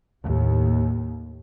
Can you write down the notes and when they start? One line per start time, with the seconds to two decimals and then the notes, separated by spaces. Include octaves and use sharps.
0.25 D#2 A2